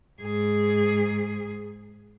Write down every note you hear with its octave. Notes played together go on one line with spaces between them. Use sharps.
G#2 G#4